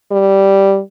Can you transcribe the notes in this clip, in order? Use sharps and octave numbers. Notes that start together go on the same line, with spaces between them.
G3